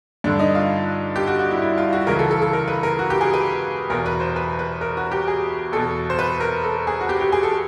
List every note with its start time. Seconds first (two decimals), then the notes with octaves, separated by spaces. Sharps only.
0.24 G2 D3 D4
0.39 D#4
0.55 F4
1.16 G4
1.27 F#4
1.39 F#4
1.51 E4
1.62 E4
1.78 F4
1.93 F#4
2.07 C#2 C#3 E3 A#4
2.19 A4
2.31 A4
2.42 A4
2.53 A#4
2.68 B4
2.83 A#4
2.99 F#4
3.10 G4
3.21 G#4
3.33 B4
3.90 E2 B2 A#4
4.06 B4
4.20 C5
4.36 B4
4.59 B4
4.81 A#4
4.97 F#4
5.11 G4
5.27 G#4
5.72 E2 B2 A4
6.10 C5
6.19 B4
6.40 A#4
6.63 A4
6.87 G#4
7.01 F#4
7.09 G4
7.21 G4
7.32 G#4
7.43 A4